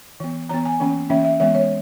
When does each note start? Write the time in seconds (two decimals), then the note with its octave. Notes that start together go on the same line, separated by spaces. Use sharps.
0.20 E3 B3
0.49 E3 B3 A#5
0.65 G#5
0.80 E3 A#3 C#4
1.10 E3 A#3 C#4 E5
1.25 E5
1.40 E3 G#3 B3 E5
1.55 C#5